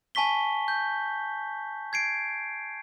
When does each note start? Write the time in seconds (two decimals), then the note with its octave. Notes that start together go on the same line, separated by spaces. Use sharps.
0.15 G#5 A5 C#6 B6 G7
0.68 G6
1.93 G#6 C7 D7